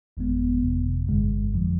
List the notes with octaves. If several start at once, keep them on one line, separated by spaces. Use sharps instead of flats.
G1 F2 D#3 G#3 B3
G1 F2 C3
G1 G2 D3 G#3
F2 D3 F3